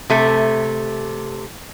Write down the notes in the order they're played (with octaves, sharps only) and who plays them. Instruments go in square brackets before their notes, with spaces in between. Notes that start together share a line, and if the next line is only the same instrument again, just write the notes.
[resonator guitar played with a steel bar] C3 A3